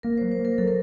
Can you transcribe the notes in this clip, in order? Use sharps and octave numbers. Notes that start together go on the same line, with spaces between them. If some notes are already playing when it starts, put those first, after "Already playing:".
A#3 A#4
F#3 C5
C5
A#3
A#4
F#3 A4
A#4